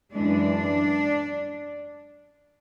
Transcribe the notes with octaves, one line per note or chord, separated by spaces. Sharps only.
F#2 E3 G#3 D4